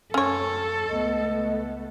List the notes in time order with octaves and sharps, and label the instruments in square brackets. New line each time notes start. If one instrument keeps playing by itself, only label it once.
[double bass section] F#2 [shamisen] C#4 C#5 [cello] A4
[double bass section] C#2 A3 B3 [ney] D#5